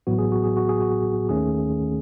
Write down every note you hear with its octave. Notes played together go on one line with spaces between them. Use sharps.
A1 A2 F#3 B3 F#4
G#4
F#4
G#4
F#4
G#4
F#4
D#2 D#3 A3 C#4 G#4